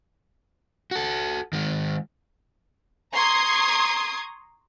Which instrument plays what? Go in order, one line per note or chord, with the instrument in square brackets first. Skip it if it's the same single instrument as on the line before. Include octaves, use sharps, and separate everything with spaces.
[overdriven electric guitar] F#4 A4
D#3 G#3
[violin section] A#5 C6 C#6 D#6 G#6